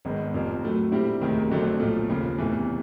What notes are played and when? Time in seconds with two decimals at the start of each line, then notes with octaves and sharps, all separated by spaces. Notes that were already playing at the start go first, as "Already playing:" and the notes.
0.05 G#1 G#2 D#3 G#3 B3
0.34 F1 F2 C3 F3 A#3
0.63 A2 F#3 A3
0.92 A#2 G3 C4 E4 G4
1.21 E1 D2 C3 D#3
1.51 F2 D3 F#3 A3 C4
1.80 B1 A#2 F3 A3
2.09 D#2 C#3 F3
2.38 F1 E2 C3 E3 A3